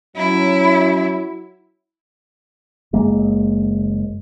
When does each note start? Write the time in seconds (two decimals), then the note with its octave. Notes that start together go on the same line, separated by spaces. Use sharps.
0.16 F#3 C#4 E4
2.93 F#1 G#3 A#3